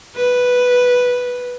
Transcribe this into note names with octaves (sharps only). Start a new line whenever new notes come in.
B4